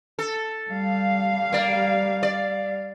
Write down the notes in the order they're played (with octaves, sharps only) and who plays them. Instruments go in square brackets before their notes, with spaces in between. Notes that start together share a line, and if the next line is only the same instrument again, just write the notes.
[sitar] A4
[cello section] G3 F5
[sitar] A#3 D5
D5